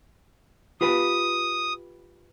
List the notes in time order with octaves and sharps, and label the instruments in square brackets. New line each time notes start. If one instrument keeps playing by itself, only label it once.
[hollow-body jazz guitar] F4 G4 B4 [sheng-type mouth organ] D#6